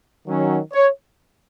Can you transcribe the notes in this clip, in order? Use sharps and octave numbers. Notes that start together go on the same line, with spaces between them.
D#3 F#3 C#4
C#5